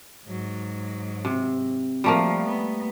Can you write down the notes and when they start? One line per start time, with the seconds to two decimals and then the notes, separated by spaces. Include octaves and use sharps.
0.26 G#2 F#3
1.25 C3
2.04 F3 G3 A3 A#3
2.47 B3